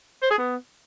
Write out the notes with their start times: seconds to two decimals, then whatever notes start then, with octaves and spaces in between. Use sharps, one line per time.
0.22 C5
0.30 G#4
0.38 B3